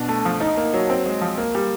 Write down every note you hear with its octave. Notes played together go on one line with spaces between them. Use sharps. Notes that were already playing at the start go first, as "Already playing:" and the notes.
Already playing: B2 D4
A3
F3
D#4
A#3
F#3
C4
G#3
F3
A#3
G3